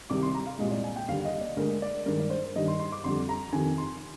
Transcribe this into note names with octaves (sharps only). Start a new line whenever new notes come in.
C2 C3 D#3 G3 D6
C6
A#5
F5
C2 A#2 G#3 D#5
D5
G#5
G5
D#2 D3 G3 F5
D#5
D5
D2 D3 G#3 A#4
D5
G2 D#3 G#3 A#4
D5
C5
G2 D#3 G3 D#5
C6
C6
D6
F2 D3 G3 C6
A#5
F2 C3 D#3 G#5
C6